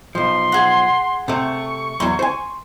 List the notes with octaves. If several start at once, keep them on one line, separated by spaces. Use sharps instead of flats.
B1 F3 C6
G#4 F#5
C3 A3 C#6
E2 F#3 C6
C5 G#5